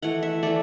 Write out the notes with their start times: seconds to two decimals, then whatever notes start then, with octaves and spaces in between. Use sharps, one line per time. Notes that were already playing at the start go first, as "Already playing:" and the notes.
0.02 E3 A3 F#5
0.23 E5
0.43 E3 A3 D5